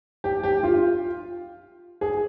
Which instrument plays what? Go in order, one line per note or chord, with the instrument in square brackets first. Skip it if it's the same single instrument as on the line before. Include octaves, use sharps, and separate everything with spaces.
[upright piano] G4
G4
F4
G#4